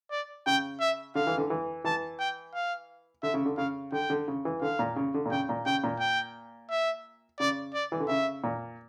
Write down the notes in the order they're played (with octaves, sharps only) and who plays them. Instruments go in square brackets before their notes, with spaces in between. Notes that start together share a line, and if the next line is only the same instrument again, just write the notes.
[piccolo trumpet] D5
[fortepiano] C#3 [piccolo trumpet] G5
[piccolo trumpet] E5
[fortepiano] D3 [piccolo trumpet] F5
[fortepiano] E3
D3
E3
[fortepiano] E3 [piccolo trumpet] A5
[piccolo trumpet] G5
F5
[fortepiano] D3 [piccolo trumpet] E5
[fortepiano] C#3
D3
[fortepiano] C#3 [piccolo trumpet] F5
[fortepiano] D3 [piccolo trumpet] G5
[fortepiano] D3
C#3
E3
[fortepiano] D3 [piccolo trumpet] F5
[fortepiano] A#2
C#3
D3
A#2
[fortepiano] C#3 [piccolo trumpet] G5
[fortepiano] A#2
[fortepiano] C#3 [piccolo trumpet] G5
[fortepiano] A#2
[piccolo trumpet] G5
E5
[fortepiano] C#3 [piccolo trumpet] D5
[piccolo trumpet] D5
[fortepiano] E3
D3
[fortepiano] C#3 [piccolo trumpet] E5
[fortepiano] A#2